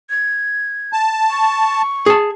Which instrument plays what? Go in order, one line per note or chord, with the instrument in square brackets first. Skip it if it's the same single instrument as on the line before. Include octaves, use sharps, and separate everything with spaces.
[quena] G#6
[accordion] A5
[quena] C#6
[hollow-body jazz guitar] G#4 A5